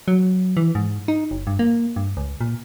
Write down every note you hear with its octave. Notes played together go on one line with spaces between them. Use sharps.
F#3
E3
G#2
D#4
F#1
G2
A#3
G2
C#2
A#2